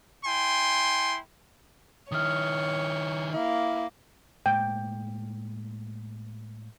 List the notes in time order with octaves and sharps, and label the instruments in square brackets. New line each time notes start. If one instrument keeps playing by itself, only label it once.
[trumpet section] E4 G5 G#5 C6
[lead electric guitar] D#3 E4 [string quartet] C#5 [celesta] D#6 F6
[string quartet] A#3 [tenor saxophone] E4
[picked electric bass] A2 G#3 A#3 [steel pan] G5